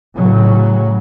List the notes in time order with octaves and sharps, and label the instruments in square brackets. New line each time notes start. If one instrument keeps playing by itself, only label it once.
[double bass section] A2 C#3 F#3